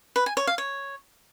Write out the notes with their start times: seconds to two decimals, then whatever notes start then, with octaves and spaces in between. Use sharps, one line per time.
0.16 B4
0.26 G#5
0.37 C#5
0.47 F5
0.58 C#5